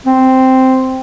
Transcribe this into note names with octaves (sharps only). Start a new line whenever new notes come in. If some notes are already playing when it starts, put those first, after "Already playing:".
C4